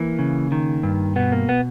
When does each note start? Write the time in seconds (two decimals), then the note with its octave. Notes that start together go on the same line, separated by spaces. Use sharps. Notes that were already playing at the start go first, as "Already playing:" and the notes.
Already playing: E3 A#3
0.19 C#3
0.52 D#3
0.83 G2
1.16 B2 B3
1.32 A#3
1.49 B3